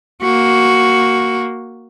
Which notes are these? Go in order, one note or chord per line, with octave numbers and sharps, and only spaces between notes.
A#3 F#4